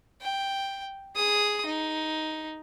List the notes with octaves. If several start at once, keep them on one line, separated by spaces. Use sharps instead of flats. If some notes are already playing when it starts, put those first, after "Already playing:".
G5
G#4 D#6
D#4